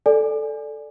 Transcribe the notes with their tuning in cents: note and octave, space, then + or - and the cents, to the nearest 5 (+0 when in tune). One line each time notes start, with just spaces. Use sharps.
A4 +0 D5 +0 G#5 +0